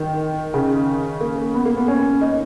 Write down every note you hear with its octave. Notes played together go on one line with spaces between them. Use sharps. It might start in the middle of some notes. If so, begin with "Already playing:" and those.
Already playing: D#3
C#3
A#3
B3
A#3
B3
C#4
D#4